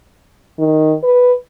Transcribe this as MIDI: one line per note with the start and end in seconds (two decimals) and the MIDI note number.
0.59 0.95 51
1.03 1.33 71